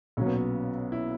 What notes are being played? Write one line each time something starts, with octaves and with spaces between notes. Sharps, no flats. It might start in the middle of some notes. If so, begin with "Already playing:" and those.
B1 A#2 F#3 C#4
B3
C#4
E4